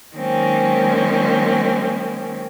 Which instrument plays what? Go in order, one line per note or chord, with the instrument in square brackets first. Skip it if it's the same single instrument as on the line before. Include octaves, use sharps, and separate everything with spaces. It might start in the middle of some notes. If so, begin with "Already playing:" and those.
[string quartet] D#3 F#3 G#3 A#3 C4 C#4